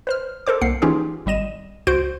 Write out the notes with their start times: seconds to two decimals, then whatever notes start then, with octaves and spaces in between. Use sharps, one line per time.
0.07 B4 C5 F6
0.47 A4 A#4 C5 D6
0.61 C2 A#3 F#5 C7 C#7
0.82 E3 C#4 D#4 F4 G4 G#4
1.26 G#1 G3 D#5 D#7 E7
1.87 C#2 F#4 C5 G6 D7